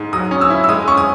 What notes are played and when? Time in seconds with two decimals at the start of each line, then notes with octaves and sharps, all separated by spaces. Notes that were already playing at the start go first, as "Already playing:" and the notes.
Already playing: G#2
0.13 F#3 D#6
0.31 C#4
0.41 E6
0.50 E4
0.64 E6
0.69 G#3 D#6
0.88 C#4 C#6
0.97 D#6